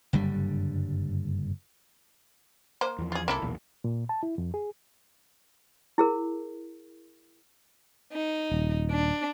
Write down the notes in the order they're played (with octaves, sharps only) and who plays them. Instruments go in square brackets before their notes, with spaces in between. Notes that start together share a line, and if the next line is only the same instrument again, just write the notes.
[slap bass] F#1 G2 D3 G3
[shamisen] A#3 C5
[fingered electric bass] E2 F3
[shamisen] F4 G#4
[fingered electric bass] C2 [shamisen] A#3 E4 A4
[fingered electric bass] B1 E2 A#2
[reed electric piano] A#2
A5
E4
F2
G#4
[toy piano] E4 G#4 A#4
[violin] D#4
[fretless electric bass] D#1
[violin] D4